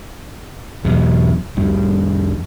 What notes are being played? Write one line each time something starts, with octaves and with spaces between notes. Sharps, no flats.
E2 B2 F#3
F2 A2 G3